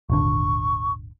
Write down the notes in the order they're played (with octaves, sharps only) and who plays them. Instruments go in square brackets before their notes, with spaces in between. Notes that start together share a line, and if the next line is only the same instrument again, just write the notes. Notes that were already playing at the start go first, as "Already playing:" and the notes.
[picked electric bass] D#1 G#1 D3 [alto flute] C#6